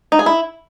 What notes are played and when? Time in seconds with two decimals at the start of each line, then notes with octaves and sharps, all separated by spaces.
0.12 D#4
0.19 G#4
0.26 E4